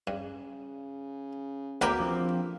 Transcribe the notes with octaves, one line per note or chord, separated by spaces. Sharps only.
G2 C#3
D2 B2 A#3 B3 G4 F#5 B5
A#1 F3 C4